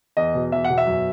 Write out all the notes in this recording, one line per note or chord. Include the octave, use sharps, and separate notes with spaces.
E2 D#5
B2
E2 E5
F#5
B2
E5
F#2